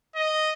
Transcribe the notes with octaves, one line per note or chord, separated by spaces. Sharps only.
D#5